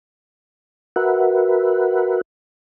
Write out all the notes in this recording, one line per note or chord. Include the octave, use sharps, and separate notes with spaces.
F#4 A#4 B4 E5 F#5